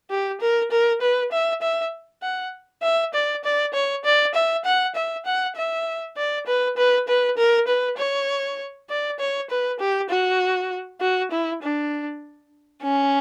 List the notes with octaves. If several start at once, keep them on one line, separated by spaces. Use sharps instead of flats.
G4
A#4
A#4
B4
E5
E5
F#5
E5
D5
D5
C#5
D5
E5
F#5
E5
F#5
E5
D5
B4
B4
B4
A#4
B4
C#5
D5
C#5
B4
G4
F#4
F#4
E4
D4
C#4